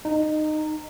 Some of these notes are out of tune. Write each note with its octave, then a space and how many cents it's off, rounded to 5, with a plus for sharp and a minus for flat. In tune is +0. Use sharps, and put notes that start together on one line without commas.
D#4 -20